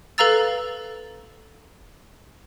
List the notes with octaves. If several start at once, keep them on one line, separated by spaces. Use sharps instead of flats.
A4 B4 F5 A#5 E6 A6